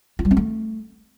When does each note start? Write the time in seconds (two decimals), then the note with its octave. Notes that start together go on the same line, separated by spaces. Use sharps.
0.19 F4
0.25 G3
0.31 C4
0.37 A3